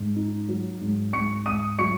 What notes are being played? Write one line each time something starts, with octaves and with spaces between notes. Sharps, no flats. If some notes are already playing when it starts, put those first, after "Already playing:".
Already playing: G#2
D#4
F#3
G#2
G#2 C#6 C#7
G#2 D#6 D#7
F#3 C#6 C#7